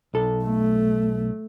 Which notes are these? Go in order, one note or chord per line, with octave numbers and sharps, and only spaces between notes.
B1 A4
A3